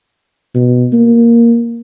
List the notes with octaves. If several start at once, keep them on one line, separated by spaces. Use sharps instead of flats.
B2
A#3